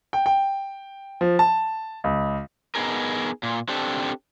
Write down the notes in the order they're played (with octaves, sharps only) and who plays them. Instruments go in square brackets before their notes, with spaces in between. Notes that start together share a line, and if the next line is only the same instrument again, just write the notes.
[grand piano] G5
G5
F3
A5
C#2
[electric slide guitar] B3 D#4 G#4 A#4
A#2
C4 D4 G4 A4